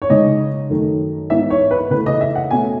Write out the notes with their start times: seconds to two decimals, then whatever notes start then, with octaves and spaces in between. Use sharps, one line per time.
0.02 C#5
0.10 C#3 G#3 D#4 D#5
0.69 F#2 D#3 A3
1.30 G#2 E3 B3 E4 E5
1.50 C#5
1.71 B4
1.90 C#3 E3 A3 B4
2.06 D#5
2.21 E5
2.35 F#5
2.51 B2 A3 C#4 G#5